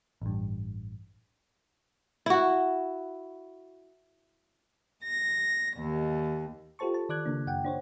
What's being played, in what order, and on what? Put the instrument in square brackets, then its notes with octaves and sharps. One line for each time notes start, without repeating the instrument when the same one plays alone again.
[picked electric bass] A1 G2
[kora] E4 F#4
[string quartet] A#6
D#2
[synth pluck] F4 G4 A4 C5 A5 C#6
A5
D#3 D5 D6 F#6 G#6
C#3 A#3 D4
F#2 F#5 G5
D4 C5 C#5